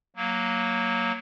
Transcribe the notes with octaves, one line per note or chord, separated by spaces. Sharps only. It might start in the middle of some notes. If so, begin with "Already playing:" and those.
F#3 A#3